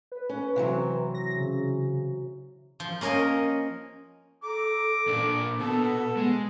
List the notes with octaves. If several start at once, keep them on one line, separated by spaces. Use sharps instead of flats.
B4
C#4
C3 E3 F#3
A#6
C#3
F3
A#3 C#4 A#4 C#5 D#5
A4 A#5 D6
A#2 D4
B2 B3 A4
G#3